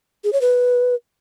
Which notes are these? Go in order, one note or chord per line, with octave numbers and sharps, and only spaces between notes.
G#4
C#5
B4